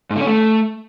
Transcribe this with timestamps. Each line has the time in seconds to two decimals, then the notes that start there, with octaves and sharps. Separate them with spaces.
0.10 G#2
0.16 D3
0.21 C#4
0.26 A3